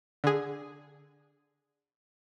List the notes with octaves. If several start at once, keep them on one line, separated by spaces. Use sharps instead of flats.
D3 G#4